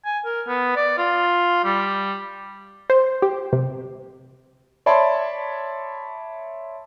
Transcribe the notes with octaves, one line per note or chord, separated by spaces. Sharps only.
G#5
A#4
B3
D5
F4
G3
C5
G4
C3
C#5 D5 E5 A5 B5 C6